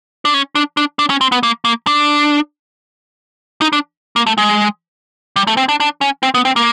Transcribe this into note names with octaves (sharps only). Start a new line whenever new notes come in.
D4
C#4
D4
D4
D4
C#4
C4
B3
A#3
A#3
D4
D#4
D4
A#3
A3
G#3
G3
A3
C4
D4
D4
C#4
C4
B3
C4
A#3